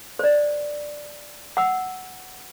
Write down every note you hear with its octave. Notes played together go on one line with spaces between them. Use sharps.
C5 D5
F#5 E6